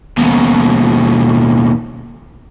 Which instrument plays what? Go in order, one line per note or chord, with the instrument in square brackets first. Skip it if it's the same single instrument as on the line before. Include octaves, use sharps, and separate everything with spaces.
[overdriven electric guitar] D#2 B2